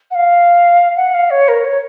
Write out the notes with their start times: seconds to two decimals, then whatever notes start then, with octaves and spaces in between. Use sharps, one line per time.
0.10 F#5
0.15 F5
0.96 F#5
1.13 F5
1.30 C#5
1.48 A#4
1.64 C#5